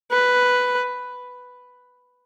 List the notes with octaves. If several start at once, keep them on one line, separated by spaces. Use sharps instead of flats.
B4